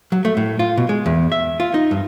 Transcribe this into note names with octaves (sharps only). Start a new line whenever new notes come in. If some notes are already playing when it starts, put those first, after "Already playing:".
F#3
A3
A2
F4
B2
G#3
E2
E5
F4
D#4
G2